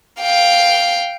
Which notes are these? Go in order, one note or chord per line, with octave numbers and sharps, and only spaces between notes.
F5 G5